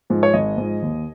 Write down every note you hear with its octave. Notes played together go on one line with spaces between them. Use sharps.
G#2 F3
C#5
G#1 D#5
G#2 F3
D#2